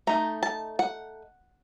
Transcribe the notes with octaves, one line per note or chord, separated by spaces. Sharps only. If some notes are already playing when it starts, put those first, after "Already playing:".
A3 D#4 A#5
A5
F#5